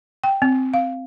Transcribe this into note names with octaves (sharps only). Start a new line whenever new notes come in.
G5
C4
F5